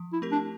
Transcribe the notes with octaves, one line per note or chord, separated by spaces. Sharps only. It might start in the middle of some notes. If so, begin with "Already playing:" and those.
Already playing: F3
E4
A3 C4 G4 A#4
D4